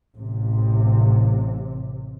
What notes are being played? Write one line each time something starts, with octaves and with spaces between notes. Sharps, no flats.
A1 C3